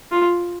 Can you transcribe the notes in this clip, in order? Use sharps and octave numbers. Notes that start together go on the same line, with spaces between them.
F4